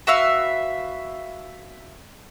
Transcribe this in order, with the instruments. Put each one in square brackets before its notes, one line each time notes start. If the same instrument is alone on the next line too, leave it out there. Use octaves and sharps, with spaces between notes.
[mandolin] F#4 B4 E5 F5